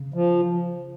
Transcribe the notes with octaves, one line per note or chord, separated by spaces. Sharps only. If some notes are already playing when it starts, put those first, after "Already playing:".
Already playing: C#3
F3